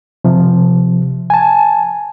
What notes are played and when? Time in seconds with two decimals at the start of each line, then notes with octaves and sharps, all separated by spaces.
0.25 C3 F3
1.30 G#5 A5